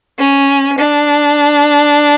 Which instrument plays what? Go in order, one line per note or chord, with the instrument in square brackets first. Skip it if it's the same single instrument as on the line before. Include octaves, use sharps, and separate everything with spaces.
[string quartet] C#4
D4